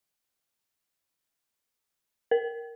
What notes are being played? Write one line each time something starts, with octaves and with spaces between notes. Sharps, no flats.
A#4